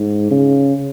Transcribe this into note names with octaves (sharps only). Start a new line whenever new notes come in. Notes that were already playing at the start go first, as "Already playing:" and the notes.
Already playing: G#2
C#3